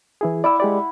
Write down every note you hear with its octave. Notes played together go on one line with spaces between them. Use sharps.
E3 E4 G#4
E4 D5 F#5 D6 E6
G#3 G4 D5